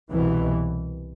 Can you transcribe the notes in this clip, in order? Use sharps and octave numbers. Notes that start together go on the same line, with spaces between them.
C2 B2 E3